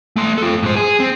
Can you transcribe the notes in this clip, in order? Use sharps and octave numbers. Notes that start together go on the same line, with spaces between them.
A3 C6
F4 A4
G#2 C5
G#4
C4